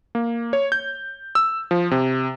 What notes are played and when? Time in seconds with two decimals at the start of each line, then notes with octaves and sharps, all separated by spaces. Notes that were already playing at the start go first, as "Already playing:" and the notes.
0.15 A#3
0.53 C#5
0.72 G6
1.35 E6
1.71 F3
1.91 C3